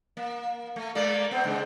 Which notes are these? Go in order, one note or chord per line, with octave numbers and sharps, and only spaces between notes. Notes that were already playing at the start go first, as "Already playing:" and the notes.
A#3
A3
G#3 A#3 D5
B3 C4
C#3 G#3 C4